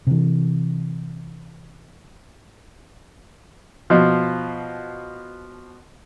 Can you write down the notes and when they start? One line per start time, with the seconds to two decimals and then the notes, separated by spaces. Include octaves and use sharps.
0.07 C3 E3
3.90 B2 F3